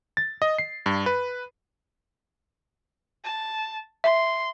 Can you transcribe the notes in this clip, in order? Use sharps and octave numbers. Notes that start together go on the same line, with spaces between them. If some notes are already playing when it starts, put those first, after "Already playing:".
A6
D#5
C7
G2
B4
A5
E5 C6